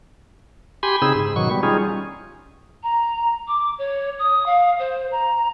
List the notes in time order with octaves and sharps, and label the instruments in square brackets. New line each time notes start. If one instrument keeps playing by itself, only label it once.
[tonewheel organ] G4 G#5 B5 C6
C#3 C4 D#4 G#4 B5 E6
G#2
B2 D#3 F#3 C#6
G3 B3
G3 C#4 D#4 F4 G#4
[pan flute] A#5
D6
C#5
D#6
F5
C5
A#5